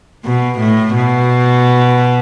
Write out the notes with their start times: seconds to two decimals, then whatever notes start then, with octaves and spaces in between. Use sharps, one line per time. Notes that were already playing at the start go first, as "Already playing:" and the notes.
0.25 B2
0.59 A2
0.95 B2